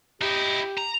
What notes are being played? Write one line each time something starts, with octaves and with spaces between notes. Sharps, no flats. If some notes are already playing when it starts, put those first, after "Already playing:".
D#4 E4 G4
A#5